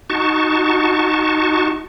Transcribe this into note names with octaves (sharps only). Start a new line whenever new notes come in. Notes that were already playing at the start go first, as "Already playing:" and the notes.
D#4 F#4 A5 C#6